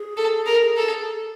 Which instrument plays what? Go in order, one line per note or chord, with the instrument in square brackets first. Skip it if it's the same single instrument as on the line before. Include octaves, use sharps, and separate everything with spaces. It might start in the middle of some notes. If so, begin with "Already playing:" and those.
Already playing: [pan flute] G#4
[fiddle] A4
A#4
A4